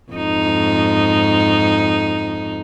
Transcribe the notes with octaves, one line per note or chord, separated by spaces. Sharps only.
F2 G#2 D#4